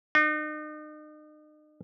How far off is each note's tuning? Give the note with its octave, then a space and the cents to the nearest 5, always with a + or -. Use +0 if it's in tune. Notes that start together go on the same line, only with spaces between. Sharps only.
D#4 -40